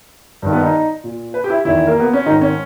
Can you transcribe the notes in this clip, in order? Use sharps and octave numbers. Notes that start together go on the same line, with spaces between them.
G2 D#3
B3
D#4
A#2
B4
G4
E4
E2 D#3 E4
A#3
B3
C#4
G#2 D#3 D#4
C#4